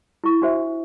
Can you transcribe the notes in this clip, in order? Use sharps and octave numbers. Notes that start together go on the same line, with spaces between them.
E4 C#6
D4 F#4 C5 E5